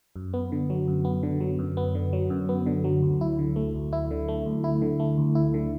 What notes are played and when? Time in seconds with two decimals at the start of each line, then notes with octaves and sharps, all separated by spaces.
0.16 F#2
0.34 B3
0.52 D3
0.70 F#3
0.88 F#2
1.05 B3
1.23 D3
1.40 F#3
1.59 F#2
1.77 B3
1.95 D3
2.13 F#3
2.30 F#2
2.49 B3
2.66 D3
2.84 F#3
3.03 D2
3.21 E4
3.39 D3
3.56 A3
3.74 D2
3.93 E4
4.11 D3
4.28 A3
4.46 D2
4.64 E4
4.82 D3
5.00 A3
5.18 D2
5.35 E4
5.54 D3